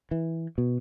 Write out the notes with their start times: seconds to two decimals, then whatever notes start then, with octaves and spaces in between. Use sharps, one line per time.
0.11 E3
0.58 B2